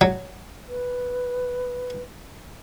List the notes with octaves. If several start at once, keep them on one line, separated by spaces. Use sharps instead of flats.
F#3
B4